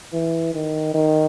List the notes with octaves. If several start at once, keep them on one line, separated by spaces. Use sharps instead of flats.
E3
D#3
D#3